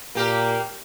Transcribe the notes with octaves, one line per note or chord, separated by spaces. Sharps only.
A#2 A#3 G4 A#4